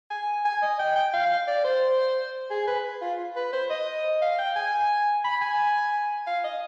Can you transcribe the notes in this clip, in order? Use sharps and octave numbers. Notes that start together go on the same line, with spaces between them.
G#5
G#5
D#5
G5
G5
F5
D5
C5
G#4
B4
F4
B4
C5
D#5
F5
G5
G#5
B5
G#5
F5
D#5